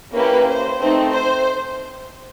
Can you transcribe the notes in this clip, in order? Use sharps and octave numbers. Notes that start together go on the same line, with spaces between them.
A#3 C#4 E4 G4 B4
C5
A3 C4 D#4
C5